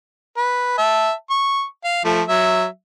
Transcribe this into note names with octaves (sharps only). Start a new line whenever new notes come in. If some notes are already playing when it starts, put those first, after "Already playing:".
B4
E5 A5
C#6
F5
F3 A3
F#3 E5